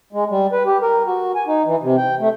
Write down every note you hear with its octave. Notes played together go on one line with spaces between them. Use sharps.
G#3
G3
B4
G4
A#4
F#4
G#5
D#4
E3
C3
G5
A3